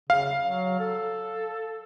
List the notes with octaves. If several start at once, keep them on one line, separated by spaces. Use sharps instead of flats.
C#3 F5
F#3
A4